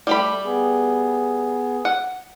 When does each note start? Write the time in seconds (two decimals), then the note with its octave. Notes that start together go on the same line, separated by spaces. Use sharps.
0.07 G3 A3 G4 B5
0.45 B3 G#4
1.85 F#5